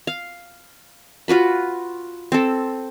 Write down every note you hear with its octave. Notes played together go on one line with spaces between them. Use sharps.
F5
F4 F#4 B4 B5
C4 A4